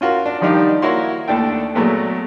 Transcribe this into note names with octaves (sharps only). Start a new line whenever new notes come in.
C#4 F4 F#4 A#4
D4
D#3 F3 G3 D4 D#4 G4
A#3 E4 F#4 C#5 C6
D#2 A3 D4 A4 G5
A#2 F#3 G#3 A3 B3